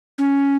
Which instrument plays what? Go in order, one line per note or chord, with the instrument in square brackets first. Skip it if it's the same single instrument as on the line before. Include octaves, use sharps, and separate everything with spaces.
[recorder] C#4